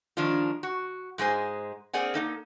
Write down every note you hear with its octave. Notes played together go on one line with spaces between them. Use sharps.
D#3 F3 G#3 D4 F4
F#4
G#2 G#3 G#4 C5
A#3 C4 G#4 D5 F#5 G#5
A#3 D#4 A4